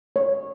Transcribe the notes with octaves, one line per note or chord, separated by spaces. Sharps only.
C#5